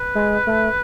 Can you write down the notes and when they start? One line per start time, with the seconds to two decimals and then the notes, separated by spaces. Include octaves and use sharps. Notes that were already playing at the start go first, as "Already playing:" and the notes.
Already playing: B4
0.15 G#3
0.47 A3